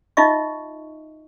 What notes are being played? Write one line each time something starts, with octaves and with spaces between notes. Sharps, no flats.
D#4 F4 D#5 E5 C#6